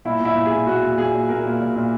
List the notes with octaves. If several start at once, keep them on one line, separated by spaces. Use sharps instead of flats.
A#2 E4
A#2
E4
A#2
G#4
A#2
A#2 F#4
A#2
A#2 G#4
A#2
A#2 A#4
A#2
A#2
A#2